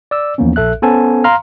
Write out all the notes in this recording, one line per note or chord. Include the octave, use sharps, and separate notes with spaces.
D5 E6
D#2 E3 F3 A#3 B3 C#4
A#1 A4 E5 F#6
B3 C#4 A4 C5 G#5 A5
F5 A#5 C6 F6